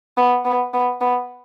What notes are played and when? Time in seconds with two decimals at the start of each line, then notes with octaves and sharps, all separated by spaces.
0.17 B3
0.45 B3
0.74 B3
1.01 B3